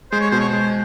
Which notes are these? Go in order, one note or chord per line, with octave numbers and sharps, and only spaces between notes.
G#3 C5
C#5
B2 C5
C#5
G#3 C5